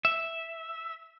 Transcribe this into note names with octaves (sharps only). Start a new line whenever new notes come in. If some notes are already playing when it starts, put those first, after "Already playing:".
E5